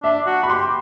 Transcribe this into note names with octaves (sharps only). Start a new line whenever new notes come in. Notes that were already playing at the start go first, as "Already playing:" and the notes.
D4 E5
F#4
B5
G4 C6